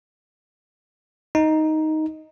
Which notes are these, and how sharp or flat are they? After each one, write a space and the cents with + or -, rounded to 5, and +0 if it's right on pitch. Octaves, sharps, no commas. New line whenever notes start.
D#4 +5